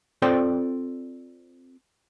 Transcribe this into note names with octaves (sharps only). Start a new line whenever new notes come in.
C4 F4 A4 C5 D5 G5